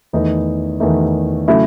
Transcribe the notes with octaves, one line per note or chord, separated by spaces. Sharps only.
E2 D#3 A3 D#4
E2 D#3 A3 D#4
C#3 F#3 A3 E4